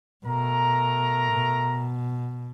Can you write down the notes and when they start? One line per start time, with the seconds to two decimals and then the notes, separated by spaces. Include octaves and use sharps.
0.24 B2 A3 A#4 A#5
1.33 B2